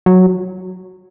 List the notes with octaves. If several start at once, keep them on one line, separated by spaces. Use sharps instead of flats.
F#3